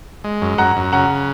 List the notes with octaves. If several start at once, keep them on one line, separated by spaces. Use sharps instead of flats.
G#3
F#2
F#2 F#5 A#5
F#2
C#3 F#5 A#5